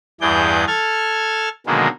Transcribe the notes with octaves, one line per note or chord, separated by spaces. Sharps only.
E2 G2 E3 G#4 D5 G6
A4 A5 F6 G#6
B2 D3 D#3 F#3 G#3 A#3